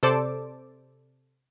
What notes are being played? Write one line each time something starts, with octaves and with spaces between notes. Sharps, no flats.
C3 A4 C5 D5 A5 D6